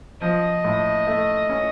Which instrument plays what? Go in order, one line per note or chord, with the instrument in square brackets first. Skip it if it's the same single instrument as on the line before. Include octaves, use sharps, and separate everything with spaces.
[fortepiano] F3 [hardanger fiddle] D#5
[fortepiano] A2
A3
C#4